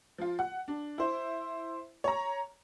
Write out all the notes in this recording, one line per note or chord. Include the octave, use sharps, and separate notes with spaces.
F3 F4
F#5
D4
E4 C5
C#5 A#5